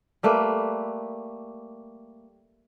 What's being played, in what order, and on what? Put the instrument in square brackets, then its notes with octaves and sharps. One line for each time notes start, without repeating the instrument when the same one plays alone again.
[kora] G3 A3 A#3 B4